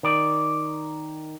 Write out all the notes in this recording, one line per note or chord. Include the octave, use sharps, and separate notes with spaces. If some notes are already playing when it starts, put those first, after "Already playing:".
D#3 D5